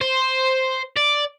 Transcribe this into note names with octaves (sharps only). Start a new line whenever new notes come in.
C5
D5